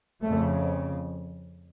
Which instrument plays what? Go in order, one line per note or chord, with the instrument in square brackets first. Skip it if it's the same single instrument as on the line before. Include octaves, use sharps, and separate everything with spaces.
[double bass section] F2 C#3 A3